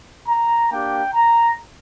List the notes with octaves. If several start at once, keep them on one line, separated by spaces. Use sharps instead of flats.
A#5
A#3 D4 G4 G5
A#5